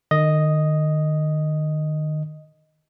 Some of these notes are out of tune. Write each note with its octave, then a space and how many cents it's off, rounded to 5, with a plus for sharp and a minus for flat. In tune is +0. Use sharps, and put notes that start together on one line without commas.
D#3 -35 D#5 +0